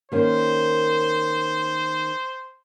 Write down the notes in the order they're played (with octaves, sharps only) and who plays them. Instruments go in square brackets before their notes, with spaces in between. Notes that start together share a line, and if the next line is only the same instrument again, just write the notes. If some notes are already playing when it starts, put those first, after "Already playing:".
[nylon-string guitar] D#3 A#3 C#4 [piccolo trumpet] C5